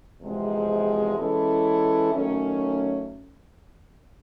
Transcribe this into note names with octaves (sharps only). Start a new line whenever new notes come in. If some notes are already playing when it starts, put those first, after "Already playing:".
E2 C3 F3 G#3 C4
E3 G#3 C#4 E4 A4
D#3 F#3 A3 C#4